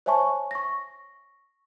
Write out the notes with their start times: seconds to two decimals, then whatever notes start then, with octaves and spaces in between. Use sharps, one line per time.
0.06 C5 C#5 E5 G#5 A5 C#6
0.51 C#6 A#6